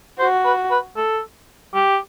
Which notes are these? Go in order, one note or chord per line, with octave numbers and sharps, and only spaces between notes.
F#4 C5
B4
B4
A4
G4